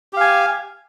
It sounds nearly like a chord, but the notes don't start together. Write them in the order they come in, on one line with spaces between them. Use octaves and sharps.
G4 F5 G#5